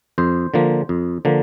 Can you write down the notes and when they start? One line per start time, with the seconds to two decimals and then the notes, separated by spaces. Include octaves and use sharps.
0.18 F2 C5
0.54 D3 F3 A#3
0.89 F2
1.25 D3 F3 A#3